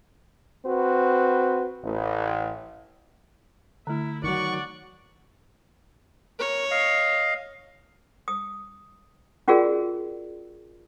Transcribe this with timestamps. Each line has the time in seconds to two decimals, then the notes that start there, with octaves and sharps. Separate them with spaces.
0.66 C4 F#4 B4
1.84 A1
3.87 D3 A3 E4
4.24 D#3 E3 F#3 D5 F#5 C#6
6.40 A#4 C#5
6.71 D#5 F5
8.28 D#6
9.48 C#4 F4 F#4 G#4 A#4 D5